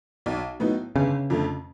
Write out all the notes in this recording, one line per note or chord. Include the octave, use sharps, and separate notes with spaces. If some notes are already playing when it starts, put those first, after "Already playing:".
B1
A2 F#3 B3 D#4
G1 C#3
F2 D3 F3 A3